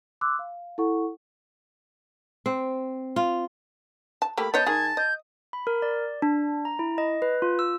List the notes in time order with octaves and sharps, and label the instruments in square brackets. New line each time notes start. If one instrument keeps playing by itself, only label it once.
[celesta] C6 D6 E6 F#6
F5
E4 A4 F#5 C#6
[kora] C4
F4
[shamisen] A5
[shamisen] A3 A#3 G4 [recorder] B5
[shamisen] B3 C#5 D#5 [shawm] A5 [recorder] G6
[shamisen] D#3 G#4 [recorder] G#6
[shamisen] D#5 [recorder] G6
[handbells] B5
A#4
D5
D4
A#5
E4
D#5
B4
F4
E6